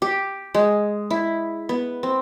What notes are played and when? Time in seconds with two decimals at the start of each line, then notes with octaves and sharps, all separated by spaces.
0.02 G4
0.54 G#3
1.10 E4
1.69 B3
2.03 C4